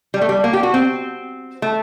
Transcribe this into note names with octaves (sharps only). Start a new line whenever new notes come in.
G3
A3
G3
A#3
G4
F#4
C4
A3